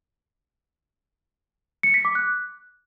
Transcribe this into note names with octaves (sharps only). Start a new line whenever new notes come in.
C#7
B6
D6
F#6